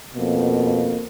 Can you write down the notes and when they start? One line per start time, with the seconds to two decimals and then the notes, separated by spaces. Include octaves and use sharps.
0.15 F2 B2 A#3